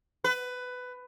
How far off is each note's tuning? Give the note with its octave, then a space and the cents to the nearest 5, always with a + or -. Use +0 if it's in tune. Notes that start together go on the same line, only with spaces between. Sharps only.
B4 +15